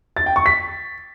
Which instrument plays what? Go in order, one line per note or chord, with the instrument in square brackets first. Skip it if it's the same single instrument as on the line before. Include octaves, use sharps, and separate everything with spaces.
[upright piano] A6
G5
C#6
B6